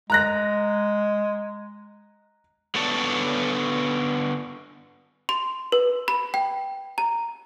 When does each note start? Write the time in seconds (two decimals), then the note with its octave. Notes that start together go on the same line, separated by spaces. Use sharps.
0.10 G#3 A#5 F#6 A#6
2.75 D3 B3 C#5 D5 A5
5.29 C6
5.72 B4
6.08 B5
6.34 G5
6.98 A#5